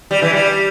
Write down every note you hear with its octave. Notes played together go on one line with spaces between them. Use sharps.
G3
E3
G3